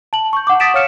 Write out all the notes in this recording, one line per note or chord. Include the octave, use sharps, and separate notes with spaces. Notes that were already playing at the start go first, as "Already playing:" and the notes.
A5 F#7
C#6 G6
F#5 D6
D#6 A6 B6 D7 E7
C#5 F5 F6 C#7 E7